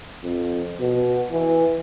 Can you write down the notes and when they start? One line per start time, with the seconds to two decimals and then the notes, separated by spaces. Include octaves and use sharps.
0.23 F2
0.80 B2
1.32 E3